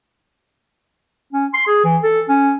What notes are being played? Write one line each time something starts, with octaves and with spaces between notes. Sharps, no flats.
C#4
C6
G#4
E3
A4
C#4